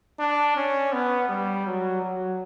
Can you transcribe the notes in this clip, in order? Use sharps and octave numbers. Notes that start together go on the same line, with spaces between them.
D4
C#4
B3
G3
F#3
F#3